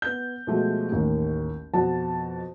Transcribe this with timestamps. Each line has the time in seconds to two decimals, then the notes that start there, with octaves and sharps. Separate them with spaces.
0.02 B3 G6
0.47 B2 F3 G#3 A3 F#4
0.92 A1 D#2 D#3
1.74 F2 B2 F#4 A5